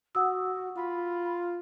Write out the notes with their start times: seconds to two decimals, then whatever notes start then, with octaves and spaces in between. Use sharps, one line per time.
0.15 F#4 F#5 D#6 E6
0.77 F4 B5